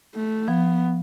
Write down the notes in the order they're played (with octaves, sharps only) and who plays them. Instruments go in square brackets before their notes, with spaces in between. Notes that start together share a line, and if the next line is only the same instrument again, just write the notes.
[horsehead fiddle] A3
[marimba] F3 [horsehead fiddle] B3